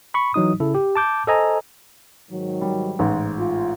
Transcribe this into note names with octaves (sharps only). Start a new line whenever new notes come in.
B5 C#6
E3 F#3 D#4 D#6
C#3 E4 A4
G4
A5 D6 G6
A4 C5 D#5 G#5 A#5
G#2 D#3 F#3
G3
A1 G#2
F4